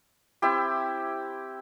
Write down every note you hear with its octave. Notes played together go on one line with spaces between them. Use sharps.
C4 E4 G4